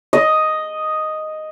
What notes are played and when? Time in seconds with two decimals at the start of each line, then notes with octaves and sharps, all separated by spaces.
0.13 D#5